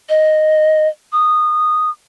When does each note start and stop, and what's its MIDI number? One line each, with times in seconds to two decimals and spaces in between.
0.09 0.88 75
1.13 1.90 87